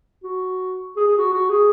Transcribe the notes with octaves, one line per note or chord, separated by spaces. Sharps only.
F#4
G#4
G#4
F#4
F#4
G#4